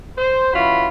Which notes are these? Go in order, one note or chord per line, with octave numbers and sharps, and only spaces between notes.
C5
E3 C#4 F4 F#4 B5